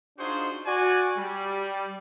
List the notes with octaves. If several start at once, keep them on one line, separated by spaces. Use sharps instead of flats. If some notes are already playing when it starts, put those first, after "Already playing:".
D4 D#4 F4 F#4 G#4 C5
F#4 D5 G#5
G3